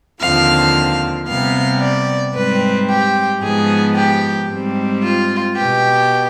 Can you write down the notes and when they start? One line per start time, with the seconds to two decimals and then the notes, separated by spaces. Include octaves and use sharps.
0.20 D#2 D3 F3 C4 F5
1.27 C3 G3 B3 F5
1.80 D5
2.34 G#2 G3 C4 B4
2.88 G4
3.41 G#2 F3 B3 G#4
3.95 G4
4.48 G#2 G3 C4
5.02 F4
5.56 B2 B3 G4